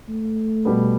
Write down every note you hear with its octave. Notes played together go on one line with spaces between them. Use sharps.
A3
B2 G3 B3